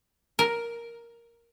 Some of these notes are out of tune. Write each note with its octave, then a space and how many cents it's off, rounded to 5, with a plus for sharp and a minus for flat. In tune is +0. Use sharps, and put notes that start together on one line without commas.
A#4 +5